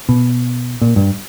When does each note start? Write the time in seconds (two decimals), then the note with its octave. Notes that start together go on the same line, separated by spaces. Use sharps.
0.09 B2
0.82 A#2
0.96 G2